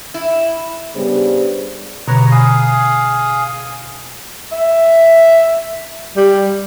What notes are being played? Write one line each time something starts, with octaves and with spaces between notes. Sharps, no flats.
E4
C#3 G3 B3 D4 G#4 C5
B2 D3 B4 C#5 A#5
G#4 F5 D#6
E5
G3